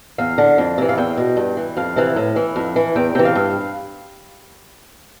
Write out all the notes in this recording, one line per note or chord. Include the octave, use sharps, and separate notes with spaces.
E2 F5
D3
F2
C3 E3
F5
E2 G5
B2
G2
E3
F2 F5
C3 E3
A2
E3
F2
E3
E2 G5
C3 E3 G5
F5
G2